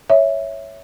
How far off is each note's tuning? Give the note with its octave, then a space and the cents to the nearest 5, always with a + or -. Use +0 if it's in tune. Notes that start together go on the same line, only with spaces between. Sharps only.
C#5 +0 E5 +0